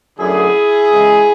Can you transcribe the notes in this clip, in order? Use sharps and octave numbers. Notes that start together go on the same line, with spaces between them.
F#2 D3 A3 E4 G#4
C#3 E3 G#3